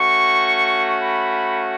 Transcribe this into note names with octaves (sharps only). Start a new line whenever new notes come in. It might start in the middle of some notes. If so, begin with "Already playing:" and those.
Already playing: A3 C#4 F#4 C#6
B5